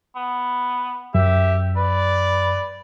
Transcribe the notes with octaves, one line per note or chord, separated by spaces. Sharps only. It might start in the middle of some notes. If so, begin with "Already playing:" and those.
B3
F#2 G4 E5
B4 D5